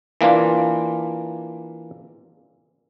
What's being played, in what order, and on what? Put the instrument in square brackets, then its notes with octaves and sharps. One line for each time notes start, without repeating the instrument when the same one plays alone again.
[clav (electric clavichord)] E3 A#3 D4 F4